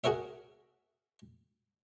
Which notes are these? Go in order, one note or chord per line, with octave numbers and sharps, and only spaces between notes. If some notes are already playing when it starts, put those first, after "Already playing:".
F#4 G#4 A#4 C#5 E5